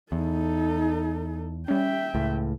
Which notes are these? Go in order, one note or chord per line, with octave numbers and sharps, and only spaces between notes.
E2 D#4 A4
G3 C#4 E5 G5
C#2 A2